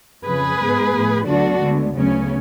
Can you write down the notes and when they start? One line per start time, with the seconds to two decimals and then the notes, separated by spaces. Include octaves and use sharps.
0.25 F2 C#3 F3 G#4 B4
0.60 G#2 G#3 B3
0.93 A2 F3 B3
1.27 D2 D3 F#3 B3 D4 F#4
1.62 D2 D3 G#3 B3
1.95 D2 C#3 F#3 B3 C#4